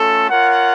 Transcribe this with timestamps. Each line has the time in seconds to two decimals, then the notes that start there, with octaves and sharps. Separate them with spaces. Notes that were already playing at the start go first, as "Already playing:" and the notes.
Already playing: A3 C#4 F4 A4
0.29 F4 A#4 C#5 F#5